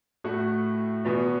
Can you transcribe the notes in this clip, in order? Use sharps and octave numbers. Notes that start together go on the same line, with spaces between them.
A2 A3 F#4
E2 B2 B3